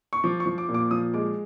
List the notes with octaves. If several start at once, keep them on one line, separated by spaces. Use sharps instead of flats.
C#6
F3 D6
C#6
F3
D6
A#2
D6
F3 D#6
G#3 D6